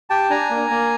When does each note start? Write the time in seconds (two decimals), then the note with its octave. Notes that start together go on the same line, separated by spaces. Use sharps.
0.10 G4 G5 A5
0.30 D4 G#5 A#5
0.51 A#3
0.70 A#3